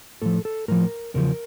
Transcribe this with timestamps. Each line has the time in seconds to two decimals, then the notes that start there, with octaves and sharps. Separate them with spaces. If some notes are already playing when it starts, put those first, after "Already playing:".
0.22 A2 F3 A4
0.45 A4
0.68 A2 F3 A#4
1.14 E2 C#3 F3 A#4